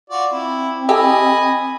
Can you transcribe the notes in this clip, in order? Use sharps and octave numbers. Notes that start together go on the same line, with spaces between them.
F4 F#4 D5
C4 E4
E4 G4 A4 D#5 G#5 B5